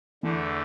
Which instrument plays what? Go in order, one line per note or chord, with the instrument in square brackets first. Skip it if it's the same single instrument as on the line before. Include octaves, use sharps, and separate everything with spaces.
[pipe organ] E2 D3 A3 [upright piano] E3 E4